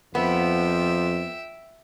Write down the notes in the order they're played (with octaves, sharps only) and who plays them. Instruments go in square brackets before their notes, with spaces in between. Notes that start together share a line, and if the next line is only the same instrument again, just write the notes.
[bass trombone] F2 [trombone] F3 [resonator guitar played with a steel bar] B3 [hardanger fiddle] E5 G5